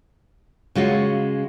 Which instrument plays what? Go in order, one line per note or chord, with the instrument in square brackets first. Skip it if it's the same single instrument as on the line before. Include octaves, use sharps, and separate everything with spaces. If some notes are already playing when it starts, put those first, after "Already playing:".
[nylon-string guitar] C#3 G#3 F4 F#4